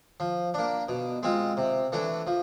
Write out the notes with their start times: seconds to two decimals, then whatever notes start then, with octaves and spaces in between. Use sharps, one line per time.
0.20 F3
0.54 A#3 D4
0.89 B2
1.23 G#3 C4 F4
1.57 C3
1.92 E3 A3 D4
2.27 F3